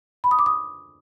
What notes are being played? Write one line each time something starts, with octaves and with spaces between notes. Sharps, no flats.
B5
D#6
D6
D#6